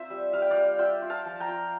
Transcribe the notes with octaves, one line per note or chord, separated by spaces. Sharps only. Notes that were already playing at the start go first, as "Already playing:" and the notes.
Already playing: C4 F4 C5 E5
G3
G3 F5
G5
D5 F5
G3
F4 E5 G5
F4
F5 A5
F3
G5 A#5
F4